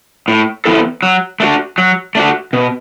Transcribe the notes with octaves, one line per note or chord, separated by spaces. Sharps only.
A2
E3 B3 E4 A4
F#3
A3 D4 F#4
F#3
A3 D4 F#4
B2